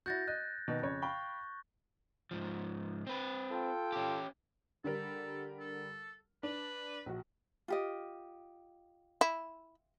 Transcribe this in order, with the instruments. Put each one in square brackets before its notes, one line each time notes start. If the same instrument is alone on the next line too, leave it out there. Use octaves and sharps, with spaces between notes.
[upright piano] E4 F#4 [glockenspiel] G6 A6 A#6
[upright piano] D#5 [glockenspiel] F#6
[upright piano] B2 D#3
F2 C#3 C#5
[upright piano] F5 G5 B5 [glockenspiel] C#6
[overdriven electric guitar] G#2 F3
C4 B4
[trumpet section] F4 A4 G5
[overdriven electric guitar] C#4 G4
[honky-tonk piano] D3 G3 A#4 [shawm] A4
[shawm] A4
[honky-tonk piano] D4 [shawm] B4
[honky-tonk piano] A#1 F#4
[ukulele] F4 G4 D#5
[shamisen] E4